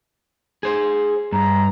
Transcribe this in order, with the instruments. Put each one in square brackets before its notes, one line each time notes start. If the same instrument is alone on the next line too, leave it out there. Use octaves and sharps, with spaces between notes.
[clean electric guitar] G#4 C5
[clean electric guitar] G2 [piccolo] A#5